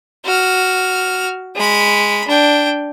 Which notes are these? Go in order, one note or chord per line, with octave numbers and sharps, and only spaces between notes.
F#4 F6
G#3 B5
D4 G5